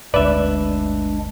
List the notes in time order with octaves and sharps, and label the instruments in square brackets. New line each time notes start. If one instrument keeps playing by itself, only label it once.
[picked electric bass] G1 D2 [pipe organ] G#3 D4 [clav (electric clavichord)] B4 E5 [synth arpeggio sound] D5